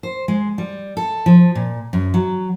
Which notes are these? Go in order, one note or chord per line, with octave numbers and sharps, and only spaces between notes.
C5
G#3
G3
A4
F3
A#2
F#2
F#3